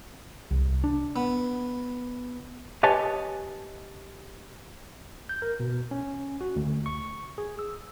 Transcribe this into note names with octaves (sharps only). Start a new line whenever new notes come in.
C2
D4
B3
G4 B4 C#5 D#5 G#5 A5
G6
A#4
B2
C#4
F#4
D2
C#6
G#4
E6